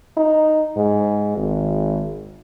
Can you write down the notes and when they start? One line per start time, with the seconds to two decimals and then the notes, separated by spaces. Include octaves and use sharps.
0.17 D#4
0.76 G#2
1.37 G#1